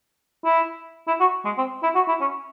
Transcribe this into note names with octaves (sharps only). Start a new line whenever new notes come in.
E4
E4
F#4
G#3
C4
E4
F#4
E4
C#4